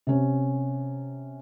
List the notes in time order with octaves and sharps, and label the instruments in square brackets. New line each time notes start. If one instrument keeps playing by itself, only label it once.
[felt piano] C3 C#4